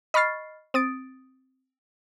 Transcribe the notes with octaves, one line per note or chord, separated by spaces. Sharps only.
D#5 B5 C#6 F6 A6 C7
C4 D#6 A6 D7